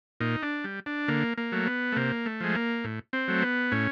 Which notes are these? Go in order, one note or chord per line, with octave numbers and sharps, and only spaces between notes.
A#2 D#4
D4
G3
D4
D3 A#3
A#3
F#3 A3
B3
A3
C3 A#3
A3
F3 G#3
A#3
A2
C4
F#3 A3
B3
A2 C#4